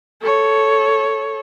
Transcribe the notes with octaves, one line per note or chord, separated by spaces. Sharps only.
A4 C#5